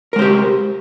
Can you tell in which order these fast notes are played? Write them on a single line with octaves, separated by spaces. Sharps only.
A#4 G#3 C5 G4